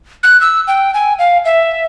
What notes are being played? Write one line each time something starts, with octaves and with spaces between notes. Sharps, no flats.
F#6
E6
G5
G#5
F5
E5